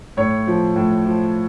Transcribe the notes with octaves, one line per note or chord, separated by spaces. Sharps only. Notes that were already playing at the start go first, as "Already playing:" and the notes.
A2 C#5
F3
A2
F3